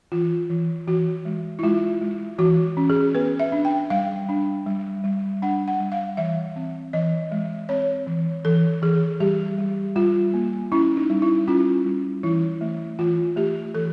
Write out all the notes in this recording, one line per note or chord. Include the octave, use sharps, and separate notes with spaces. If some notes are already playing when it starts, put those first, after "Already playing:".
E3 F4
E3
E3 F#4
G#3
E4
G#3 F4
G#3
E3 F#4
C#4
G#4
B3 B4
E5
D4
G5
G3 F5
D4
G3
G3
D4 F#5
F#5
G3
F5
E3 E5
C4
E3 D#5
G#3
C4 C#5
E3
E3 A4
E3 G#4
G3 G4
G3
G3 F4
A#3
C#4 E4
D#4
G3
E4
C#4 F4
G3
E3 E4
A3
E3 F4
A3 G4
E3 A4